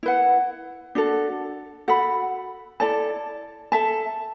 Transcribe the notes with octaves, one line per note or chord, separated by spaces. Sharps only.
E4 B4 F#5
D4 F#4 A4
F#4 A4 F#5 B5
E4 A4 D5 A5
A4 E5 A5